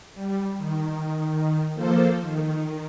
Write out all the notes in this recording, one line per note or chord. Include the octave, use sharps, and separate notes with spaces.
G3
D#3
F3 A#3 A4 C5
D#3